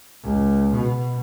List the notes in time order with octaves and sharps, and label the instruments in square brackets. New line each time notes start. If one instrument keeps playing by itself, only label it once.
[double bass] C#2
B2